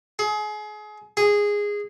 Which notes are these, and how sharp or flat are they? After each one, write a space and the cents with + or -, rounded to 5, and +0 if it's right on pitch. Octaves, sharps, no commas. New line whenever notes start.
G#4 +30
G#4 -10